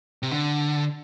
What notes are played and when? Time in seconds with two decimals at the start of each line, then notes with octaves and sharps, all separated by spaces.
0.23 C3
0.32 D3